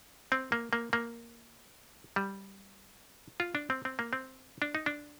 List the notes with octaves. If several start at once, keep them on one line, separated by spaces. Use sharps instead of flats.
C4
A#3
A#3
A#3
G3
F4
D4
C4
C4
A#3
C4
D4
D#4
D4